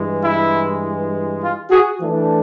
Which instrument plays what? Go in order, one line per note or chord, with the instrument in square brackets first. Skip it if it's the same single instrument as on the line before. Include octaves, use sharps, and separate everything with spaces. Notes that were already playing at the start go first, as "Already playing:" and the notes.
Already playing: [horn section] G2 E3 G#3
E4
F4
F#4 G#4
E3 A3 D4